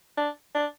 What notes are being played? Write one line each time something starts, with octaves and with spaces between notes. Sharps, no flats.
D4
D4